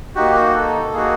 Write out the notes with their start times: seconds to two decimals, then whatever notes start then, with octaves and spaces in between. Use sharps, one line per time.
0.16 A#3 D#4 F#4 G4
0.35 F#4
0.54 A4
0.93 A#3 D#4 F#4 G#4